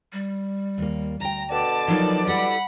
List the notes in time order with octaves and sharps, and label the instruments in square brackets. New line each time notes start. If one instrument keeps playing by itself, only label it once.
[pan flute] G3
[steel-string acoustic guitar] D#2 A#3
[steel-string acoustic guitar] D2 G5 [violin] A#5
[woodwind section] B2 D3 D5 [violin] A5
[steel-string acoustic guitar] F3 D#4 A#4 [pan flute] F#3
[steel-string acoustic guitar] G3 E4 A4 [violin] F#5 B5